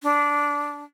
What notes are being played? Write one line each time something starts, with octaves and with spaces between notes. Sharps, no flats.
D4